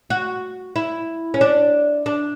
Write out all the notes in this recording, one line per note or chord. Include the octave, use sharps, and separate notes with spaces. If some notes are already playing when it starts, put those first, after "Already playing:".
F#4
E4
C#4
D4
D4